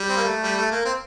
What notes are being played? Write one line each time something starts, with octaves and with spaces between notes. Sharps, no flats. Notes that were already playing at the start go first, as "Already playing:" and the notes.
Already playing: G3
C4
A#3
A3
G3
A3
A#3
C4